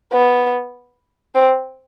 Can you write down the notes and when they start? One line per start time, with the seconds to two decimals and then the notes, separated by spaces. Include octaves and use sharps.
0.13 B3
1.35 C4